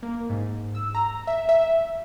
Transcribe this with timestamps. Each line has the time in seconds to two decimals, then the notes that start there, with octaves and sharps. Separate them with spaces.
0.03 A#3
0.30 G#2
0.75 E6
0.95 A#5
1.27 E5
1.49 E5